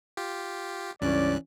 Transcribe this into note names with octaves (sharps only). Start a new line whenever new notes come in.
F4 G4
C#2 G2 E3 C#4 D5 F#6